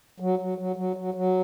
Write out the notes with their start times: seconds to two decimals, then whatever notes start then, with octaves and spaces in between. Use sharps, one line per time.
0.20 F#3
0.39 F#3
0.58 F#3
0.76 F#3
0.96 F#3
1.14 F#3